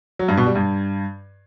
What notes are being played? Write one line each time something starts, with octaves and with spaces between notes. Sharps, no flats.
F#3
G2
B2
G3
G2